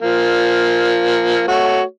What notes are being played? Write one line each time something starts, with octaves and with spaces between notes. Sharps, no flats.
F3 A#3
A3 F#4 C#5